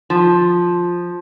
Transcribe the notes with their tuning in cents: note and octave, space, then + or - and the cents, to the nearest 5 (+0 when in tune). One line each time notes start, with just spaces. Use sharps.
F3 +5